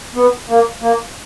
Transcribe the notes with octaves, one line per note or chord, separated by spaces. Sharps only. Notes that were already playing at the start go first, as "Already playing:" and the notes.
B3
A#3
A#3